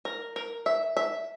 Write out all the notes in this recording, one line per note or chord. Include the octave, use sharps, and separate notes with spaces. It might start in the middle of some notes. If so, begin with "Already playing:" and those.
A#4
A#4
E5
E5